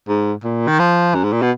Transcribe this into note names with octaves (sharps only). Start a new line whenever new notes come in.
G#2
A#2
D#3
F3
F#2
G#2
A#2
B2